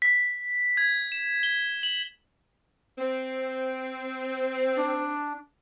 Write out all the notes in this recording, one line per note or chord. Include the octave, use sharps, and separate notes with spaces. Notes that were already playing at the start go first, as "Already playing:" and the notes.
B6
G#6
E7
G7
F#7
C4
D4